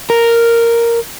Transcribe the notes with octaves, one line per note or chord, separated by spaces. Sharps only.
A#4